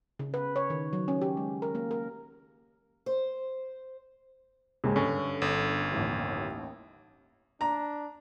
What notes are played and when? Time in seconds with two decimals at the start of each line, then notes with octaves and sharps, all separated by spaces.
0.19 C#3
0.34 B4
0.56 C#5
0.70 D#3
0.93 F#3
1.08 C#4
1.22 G4
1.37 G#3
1.62 A#4
1.75 A#3
1.91 A#4
3.06 C5
4.84 D#2 G#2 C#3
4.96 G2 D3 C#4
5.42 G1
5.92 A1 D#2 E3
7.61 D4 A#5